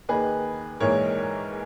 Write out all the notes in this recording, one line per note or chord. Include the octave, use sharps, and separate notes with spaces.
D#2 D#3 A#3 D#4 G#4 B4
A#1 G#2 E3 A#3 D#4 A#4 C#5